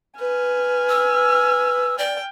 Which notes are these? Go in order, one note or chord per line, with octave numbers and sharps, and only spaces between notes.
B4 G#5 F6
E6
D5 G5